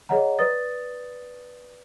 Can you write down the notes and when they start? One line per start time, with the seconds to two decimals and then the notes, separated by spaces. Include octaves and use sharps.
0.09 G#4 C#5 D#5 F#5 A#5
0.39 B4 D5 D#6 A6